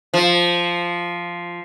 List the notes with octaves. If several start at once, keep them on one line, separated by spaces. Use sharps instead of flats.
F3